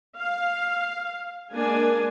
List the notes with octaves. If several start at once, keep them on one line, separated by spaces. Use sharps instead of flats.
F5
G#3 A#3 D4 G#5